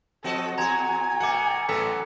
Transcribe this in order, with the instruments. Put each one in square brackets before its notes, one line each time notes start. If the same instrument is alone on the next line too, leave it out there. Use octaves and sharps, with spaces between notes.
[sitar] F3 F#4 D#5 [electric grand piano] C4 [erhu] A4
[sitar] E2 F#4 [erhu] G#5 [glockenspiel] A#5 G#6 F7
[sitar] B2 A3 [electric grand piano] F#5 [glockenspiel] D6 C#7
[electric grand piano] A1 A4 [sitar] F#3 B3 B4 [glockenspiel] E6 B6